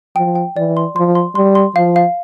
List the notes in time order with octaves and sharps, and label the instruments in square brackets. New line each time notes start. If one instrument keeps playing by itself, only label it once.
[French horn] F3 [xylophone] G5
[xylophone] G5
[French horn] E3 [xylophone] D5
[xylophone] C6
[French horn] F3 [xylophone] C6
[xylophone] C6
[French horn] G3 [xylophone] C6
[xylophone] C6
[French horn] F3 [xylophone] F5
[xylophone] F5